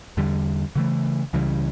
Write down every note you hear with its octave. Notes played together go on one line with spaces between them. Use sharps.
E2 D3 G3
C#3 E3 A3
C#2 C#3 E3 G3